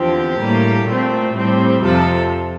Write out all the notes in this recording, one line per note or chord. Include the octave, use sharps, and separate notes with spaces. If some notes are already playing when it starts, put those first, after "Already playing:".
Already playing: E2 D3 F3 C4 G4
A2 G3 A#3
A#2 A3 C4
A2 G3 C4
F2 C3 F3 A4